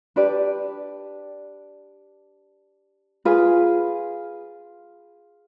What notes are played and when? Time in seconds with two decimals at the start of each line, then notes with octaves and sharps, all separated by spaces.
0.16 D4 G4 B4 D5
3.25 F4 G#4 B4